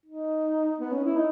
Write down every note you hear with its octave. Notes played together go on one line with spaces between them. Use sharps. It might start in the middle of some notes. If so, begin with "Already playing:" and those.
D#4
B3
C#4
E4
D#4